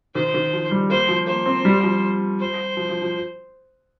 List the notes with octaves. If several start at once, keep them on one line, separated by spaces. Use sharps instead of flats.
D#3 C5
D#3
F3
G3
A#3 C5
F3
A#3 C5
C4
G3
F3
C5
F3
F3
F3